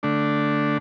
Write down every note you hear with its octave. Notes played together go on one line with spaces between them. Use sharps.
D3 A3 D4